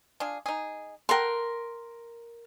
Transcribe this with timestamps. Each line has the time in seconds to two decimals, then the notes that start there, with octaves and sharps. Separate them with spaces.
0.20 D4 F4 G#4
0.46 D#4 G#4
1.09 A4 A#4 F#5 G5 C6